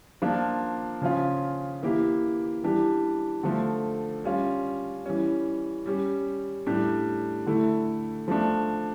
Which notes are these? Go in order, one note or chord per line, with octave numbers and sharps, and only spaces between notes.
F3 A#3 D4 F4
C#3 F3 C#4 F4
E3 A#3 E4 G4
E3 G3 D4 G4
D3 F3 A3
G3 C#4 F4
E3 G3 C#4
G3 C#4 G4
A2 G3 D4 G4
D3 A3 E4
F3 A3 D4